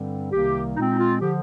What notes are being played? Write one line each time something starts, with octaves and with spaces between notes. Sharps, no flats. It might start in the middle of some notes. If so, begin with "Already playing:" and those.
Already playing: G2 D3 G3 C4
C2 C3 D#3 G3 A#3 G4
A#2 G#3 C4 D#4
D#4
F4
D3 F3 G4